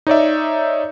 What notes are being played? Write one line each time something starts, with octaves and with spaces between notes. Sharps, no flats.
D#4 C#5 D5 E5